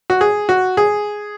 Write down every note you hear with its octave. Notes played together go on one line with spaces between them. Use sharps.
F#4
G#4
F#4
G#4